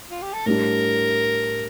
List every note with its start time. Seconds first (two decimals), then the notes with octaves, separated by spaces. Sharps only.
0.10 F4
0.22 G4
0.33 A4
0.46 A2 G3 D4 A#4